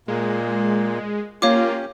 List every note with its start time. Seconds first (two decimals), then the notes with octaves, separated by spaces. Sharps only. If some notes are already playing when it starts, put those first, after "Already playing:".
0.08 A#2 G#3 A#3
1.42 A#3 C#4 F4 G4 C#5 F5 D6